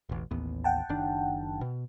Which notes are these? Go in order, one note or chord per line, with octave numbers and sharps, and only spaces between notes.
E1 A1
A1 D#2 B3
F#5 G5 A5
F#1 D#3 D4
B2